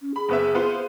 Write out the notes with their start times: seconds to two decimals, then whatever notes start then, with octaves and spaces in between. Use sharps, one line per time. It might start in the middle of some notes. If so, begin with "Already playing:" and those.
0.02 C#4
0.16 G#4 B5
0.29 F#1 B3 E5
0.55 B3 F4 C5